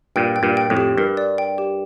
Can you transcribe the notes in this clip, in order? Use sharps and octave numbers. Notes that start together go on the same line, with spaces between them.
G2 A#2 G5
G5
G2 A#2
G5
F2 A2
G4
G2 A#4
D5
G5
G4